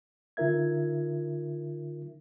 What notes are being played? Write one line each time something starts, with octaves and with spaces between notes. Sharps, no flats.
D3 D#4 F4 A#4 E5 G#6